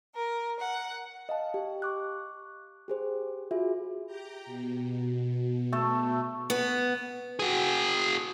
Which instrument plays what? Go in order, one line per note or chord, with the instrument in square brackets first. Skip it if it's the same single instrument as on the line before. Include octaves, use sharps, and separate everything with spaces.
[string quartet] A#4
F#5
[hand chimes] D#5 F5 A5
G4
C#6 D6 F#6
G4 G#4 C5
F4 F#4 G#4 E5
[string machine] G4 G5 A#5
B2
[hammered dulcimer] A3 A4
[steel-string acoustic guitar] B3
[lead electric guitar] F#4 G#4